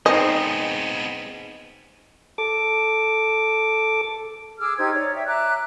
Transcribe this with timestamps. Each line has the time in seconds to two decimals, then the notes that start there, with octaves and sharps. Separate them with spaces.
0.06 G#3 B3 C4 D#4 G#4 D#5
2.38 A4 D6
4.59 G#4 D6 E6 F6
4.78 D#4 G4 C5 G#6
4.93 C#5 D5
5.14 E5 G5
5.27 E5 A#5 D6 F#6